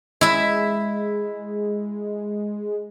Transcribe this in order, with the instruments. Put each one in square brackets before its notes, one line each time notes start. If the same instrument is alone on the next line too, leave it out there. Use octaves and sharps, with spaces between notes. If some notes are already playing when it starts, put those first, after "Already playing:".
[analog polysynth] G#3 [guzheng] E4 E5